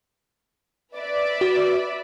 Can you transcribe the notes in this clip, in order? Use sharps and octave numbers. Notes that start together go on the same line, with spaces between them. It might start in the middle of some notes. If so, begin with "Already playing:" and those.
B4 D5 E5
F#4